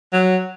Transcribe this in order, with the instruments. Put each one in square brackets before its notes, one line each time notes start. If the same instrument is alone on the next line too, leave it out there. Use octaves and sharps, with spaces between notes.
[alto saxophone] F#3